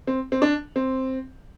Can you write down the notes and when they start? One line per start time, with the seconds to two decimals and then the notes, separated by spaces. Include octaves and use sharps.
0.07 C4
0.32 C4
0.42 D4
0.76 C4